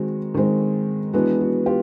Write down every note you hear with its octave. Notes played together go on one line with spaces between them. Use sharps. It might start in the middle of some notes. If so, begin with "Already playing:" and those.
Already playing: D#3 G#3 C4 F#4
D#3 G#3 C4
E3 G#3 B3 D4 F#4
F#4
F4 G4